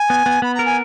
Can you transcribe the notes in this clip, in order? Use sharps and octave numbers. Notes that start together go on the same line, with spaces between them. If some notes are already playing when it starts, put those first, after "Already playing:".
Already playing: G#5
B3
B3
B3 B5
A#4 A#5
G#5